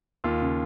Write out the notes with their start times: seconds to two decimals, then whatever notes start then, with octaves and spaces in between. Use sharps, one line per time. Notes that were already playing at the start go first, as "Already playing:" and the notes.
0.24 D#2 F4
0.42 C#3